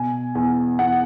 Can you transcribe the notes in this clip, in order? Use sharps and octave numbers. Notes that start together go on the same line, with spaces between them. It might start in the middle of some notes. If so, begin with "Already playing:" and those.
Already playing: B2 G#5
E2 G#5
E2 F#5